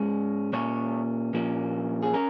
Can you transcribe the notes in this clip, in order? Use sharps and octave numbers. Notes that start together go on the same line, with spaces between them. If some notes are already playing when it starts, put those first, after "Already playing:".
Already playing: G#2 G#3 C#4
A#2 A#3 C#4 C#5
A#2 F3 A#3 C#4
G#4
C#4 A#4